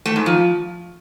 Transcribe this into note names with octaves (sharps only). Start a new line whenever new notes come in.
A3
G#2
F3